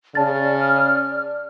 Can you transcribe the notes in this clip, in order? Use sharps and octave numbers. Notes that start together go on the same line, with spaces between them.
C#3 D5 A5 F6 A6